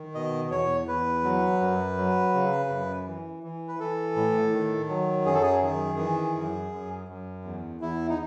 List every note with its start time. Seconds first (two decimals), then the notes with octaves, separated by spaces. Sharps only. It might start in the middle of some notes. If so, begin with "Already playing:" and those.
Already playing: D#3
0.15 B2 D#5
0.51 E2 C#5
0.87 E2 B4
1.24 F#3
1.61 F#2
1.98 F#3
2.34 C#3
2.70 F#2
3.07 E3
3.43 E3
3.68 B4
3.80 E3 A4
4.16 A2
4.53 D#3
4.89 F#3
5.25 F#2 G#4
5.34 A4
5.43 G#4
5.62 D#3 G#4
5.99 E3
6.35 F#2
6.72 F#2
7.08 F#2
7.45 E2
7.81 E2 E4
8.10 D#4